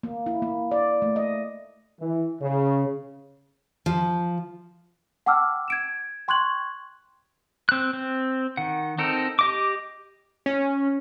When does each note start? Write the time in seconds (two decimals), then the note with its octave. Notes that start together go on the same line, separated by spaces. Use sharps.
0.03 A#3
0.26 E4
0.42 A#3
0.71 D5
1.02 A3
1.16 D#5
2.00 E3
2.41 C#3
3.86 F3
5.26 F#5 G5 A5 D6 E6 F6
5.68 G#6 D7 E7
6.28 G5 C6 C#6 F#6 G#6 F#7
7.69 C4 F#6
7.93 C4
8.57 D#3 F#5
8.98 C4 D#4 A4 A#4
9.39 G4 D#5 D6
10.46 C#4